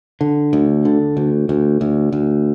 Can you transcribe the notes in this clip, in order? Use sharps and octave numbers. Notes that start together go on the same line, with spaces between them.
D3
D2
D3
D2
D2
D2
D2